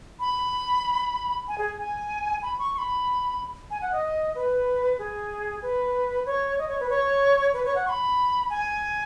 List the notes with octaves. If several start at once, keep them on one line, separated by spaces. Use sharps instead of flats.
B5
G#5
G#4
G#5
B5
C#6
C#6
B5
G#5
F#5
D#5
B4
G#4
B4
C#5
D#5
C#5
B4
C#5
B4
C#5
F#5
C#6
B5
G#5